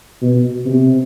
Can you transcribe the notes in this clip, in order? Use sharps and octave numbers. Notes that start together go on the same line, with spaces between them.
B2
C3